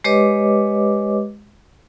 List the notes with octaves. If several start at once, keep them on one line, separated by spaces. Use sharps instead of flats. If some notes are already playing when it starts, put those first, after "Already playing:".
G#3 G4 B4 C#5 D#5 D6